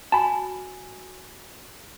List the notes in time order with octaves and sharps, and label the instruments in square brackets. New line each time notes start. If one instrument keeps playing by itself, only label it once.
[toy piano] F#4 G#5 [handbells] A5 B5